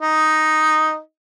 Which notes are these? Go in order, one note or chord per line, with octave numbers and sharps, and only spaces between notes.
D#4